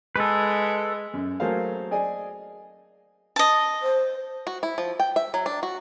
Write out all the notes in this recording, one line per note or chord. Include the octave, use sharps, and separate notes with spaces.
G#3 A4 B4
F#2
F#3 A3 A#3 G#4 C5 F5
G#4 D5 D#5 G#5
D#5 A5
C5
F#4
E4
F3
G5
E5
F#3
D4
F#4